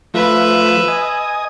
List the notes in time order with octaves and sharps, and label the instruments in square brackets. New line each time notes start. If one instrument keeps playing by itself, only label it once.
[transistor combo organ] F3 A3 F4 [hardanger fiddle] B4 E5
[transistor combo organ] D#5 G#5 D#6